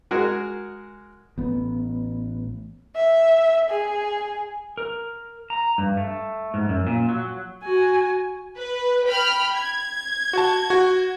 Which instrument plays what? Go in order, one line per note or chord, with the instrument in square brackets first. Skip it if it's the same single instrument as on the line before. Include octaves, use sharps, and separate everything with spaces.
[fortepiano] G#3 F#4 G#4 A#4
[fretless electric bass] A1 B3
[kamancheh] E5
G#4
[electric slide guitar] A#4
A#5
G2
A3
G#2
F#2
A#2
F#3
[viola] F#4 G#5
[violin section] B4
G5 B5 F6
G#6
[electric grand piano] F#4 A5
F#4